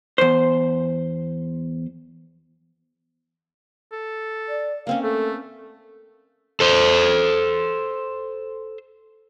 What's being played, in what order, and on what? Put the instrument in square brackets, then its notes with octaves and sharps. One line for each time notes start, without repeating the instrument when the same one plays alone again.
[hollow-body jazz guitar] E2 C5
[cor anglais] A4
[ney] D5
[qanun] A#3 C4 C#4 [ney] F5
[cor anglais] A3 [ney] A4
[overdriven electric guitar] A4 C5